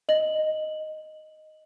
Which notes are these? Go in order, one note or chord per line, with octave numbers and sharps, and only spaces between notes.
D#5 F#7